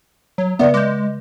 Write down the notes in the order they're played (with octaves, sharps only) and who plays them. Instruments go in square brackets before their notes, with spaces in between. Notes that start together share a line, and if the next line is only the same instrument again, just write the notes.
[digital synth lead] F#3
[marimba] C#3 D5 E5 [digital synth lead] B3
[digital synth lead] G#3 [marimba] D6 G6